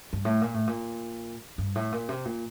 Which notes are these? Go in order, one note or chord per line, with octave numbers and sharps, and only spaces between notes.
G2
A2
A#2
A2
A#2
G2
A2
A#2
C3
A#2